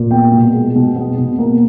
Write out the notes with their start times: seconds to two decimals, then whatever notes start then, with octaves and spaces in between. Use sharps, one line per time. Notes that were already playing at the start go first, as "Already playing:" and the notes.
Already playing: A#2
0.11 B3 G5
0.32 B2
0.53 G#3
0.75 B2
0.96 B3
1.18 B2
1.39 A#3